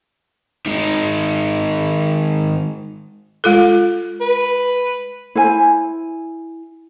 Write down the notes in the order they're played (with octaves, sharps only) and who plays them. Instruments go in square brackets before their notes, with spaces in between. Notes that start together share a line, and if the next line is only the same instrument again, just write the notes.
[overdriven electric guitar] D#3 G#3
[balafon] G#3 F4 A4
[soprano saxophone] B4
[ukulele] E4 C5 G#5